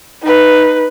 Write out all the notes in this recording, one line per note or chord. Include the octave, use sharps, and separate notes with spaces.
D#4 B4